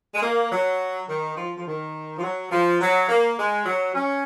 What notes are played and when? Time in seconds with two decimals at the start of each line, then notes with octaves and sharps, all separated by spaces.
0.15 G#3
0.22 A#3
0.51 F#3
1.08 D#3
1.37 F3
1.57 F3
1.66 D#3
2.18 F3
2.23 F#3
2.51 F3
2.81 F#3
3.09 A#3
3.38 G#3
3.66 F#3
3.95 C#4